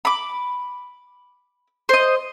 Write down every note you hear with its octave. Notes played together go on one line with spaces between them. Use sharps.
B5 D6
C5 D#5